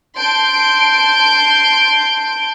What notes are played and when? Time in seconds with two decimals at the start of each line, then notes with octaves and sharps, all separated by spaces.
0.18 A5 C6 G6 D7